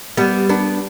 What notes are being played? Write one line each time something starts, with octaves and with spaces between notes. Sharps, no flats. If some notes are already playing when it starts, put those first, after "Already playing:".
G3 B3
B3 D4